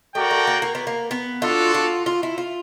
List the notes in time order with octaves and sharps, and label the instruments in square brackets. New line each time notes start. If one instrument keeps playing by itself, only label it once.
[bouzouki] A3 [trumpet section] F#4 A#4 D5 G5
[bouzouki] A3
A#3
A#3
B3
A#3
B3
[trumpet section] D4 F#4 A4 [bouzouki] F4
[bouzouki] F4
F4
E4
F4